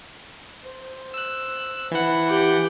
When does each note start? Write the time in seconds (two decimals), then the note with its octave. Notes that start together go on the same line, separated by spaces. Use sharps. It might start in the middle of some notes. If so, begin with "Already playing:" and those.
0.63 C5
1.14 E6 F#6
1.92 E3 F#5 B5
2.29 G4 G5